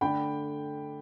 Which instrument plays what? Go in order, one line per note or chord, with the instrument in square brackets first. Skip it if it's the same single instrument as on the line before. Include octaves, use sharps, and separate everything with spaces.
[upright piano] D3 A3 D4 G5 B5